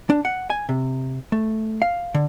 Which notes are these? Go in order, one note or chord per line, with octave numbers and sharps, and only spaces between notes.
D4
F#5
G#5
C3
A3
F5
D3